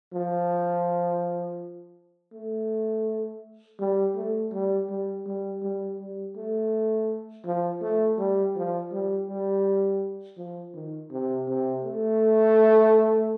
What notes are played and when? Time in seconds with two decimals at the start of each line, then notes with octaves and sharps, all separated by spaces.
0.13 F3
2.33 A3
3.79 G3
4.15 A3
4.52 G3
4.89 G3
5.26 G3
5.62 G3
5.98 G3
6.36 A3
7.45 F3
7.81 A3
8.18 G3
8.55 F3
8.91 G3
9.27 G3
10.37 F3
10.74 D#3
11.11 C3
11.47 C3
11.84 A3